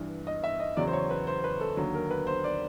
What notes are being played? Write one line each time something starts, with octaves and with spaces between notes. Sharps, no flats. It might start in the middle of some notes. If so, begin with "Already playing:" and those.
Already playing: G2 E3
D#5
E5
D#5
E2 C#3 F#3 D5
C5
C#5
B4
C5
B4
A4
D#2 D3 F#3
A#4
B4
C5
D5